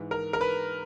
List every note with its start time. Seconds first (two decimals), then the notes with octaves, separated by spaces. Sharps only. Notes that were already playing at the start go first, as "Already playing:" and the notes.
Already playing: G#2 E3
0.11 A#4
0.33 A#4
0.41 B4